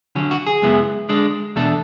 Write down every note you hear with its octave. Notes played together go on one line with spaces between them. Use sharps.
D3 F#3 C#4
F#4
G#4
F#2 C#3 G#3 B3 E4
D3 G#3 D4
E2 B2 A3 D4 A4